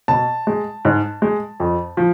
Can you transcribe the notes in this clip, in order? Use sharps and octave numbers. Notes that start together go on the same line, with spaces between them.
B2 A5
G#3
G#2
G#3
F2
F3